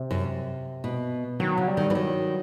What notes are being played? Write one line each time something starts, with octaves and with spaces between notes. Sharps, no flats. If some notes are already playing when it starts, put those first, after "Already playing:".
Already playing: C3
F#2
B2
D#3 F#3
C#3
G3
D#3
E3
D#3 F#3